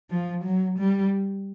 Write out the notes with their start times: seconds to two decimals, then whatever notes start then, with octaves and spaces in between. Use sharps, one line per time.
0.10 F3
0.44 F#3
0.79 G3